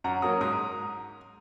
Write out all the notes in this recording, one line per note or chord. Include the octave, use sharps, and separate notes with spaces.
F#2 F#5 A#5
F#3 A#3 C#4 A#5 D#6
G#2 A#5 D#6